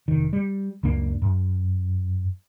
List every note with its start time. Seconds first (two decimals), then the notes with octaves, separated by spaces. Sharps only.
0.08 F1 D#3
0.33 G3
0.83 C#2 F#2 A#3 D4
1.22 F#2